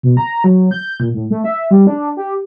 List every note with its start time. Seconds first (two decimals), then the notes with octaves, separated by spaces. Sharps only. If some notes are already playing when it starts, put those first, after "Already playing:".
0.03 B2
0.17 A#5
0.44 F#3
0.71 G6
1.00 A#2
1.14 A2
1.31 A3
1.44 E5
1.71 G3
1.87 D4
2.17 G4